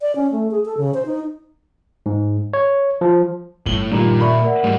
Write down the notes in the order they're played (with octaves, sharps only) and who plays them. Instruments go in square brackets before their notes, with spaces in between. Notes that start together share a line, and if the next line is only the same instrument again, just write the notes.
[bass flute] D5
C#4
A3
G#4
A4
C#3
C5
D#4
[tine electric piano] G#2
C#5
F3
[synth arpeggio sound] G1 [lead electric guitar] A2 [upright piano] F#7 G7
[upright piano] G2 D#3 F3 [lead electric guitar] A#2 [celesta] A#5
[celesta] A#4 D5 E5 [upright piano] B5 C#6
[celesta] A#4 D5 F#5
[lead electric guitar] G#2 G#3 [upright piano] G3